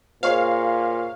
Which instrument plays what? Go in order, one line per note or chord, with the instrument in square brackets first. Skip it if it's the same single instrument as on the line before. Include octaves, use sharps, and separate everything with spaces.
[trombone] A#2 [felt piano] G#4 C#5 D#5 [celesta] C5 C#6 [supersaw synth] F5